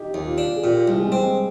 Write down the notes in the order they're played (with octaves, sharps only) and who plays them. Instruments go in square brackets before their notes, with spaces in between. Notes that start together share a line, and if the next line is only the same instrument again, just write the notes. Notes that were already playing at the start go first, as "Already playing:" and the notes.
Already playing: [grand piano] D#4 G4
[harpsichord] D#2
[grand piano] F4
[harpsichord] D4
[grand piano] G#4
[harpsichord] A#2 [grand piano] G4
[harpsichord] C2
[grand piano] G#3
[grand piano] G3 [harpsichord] C4
[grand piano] G#3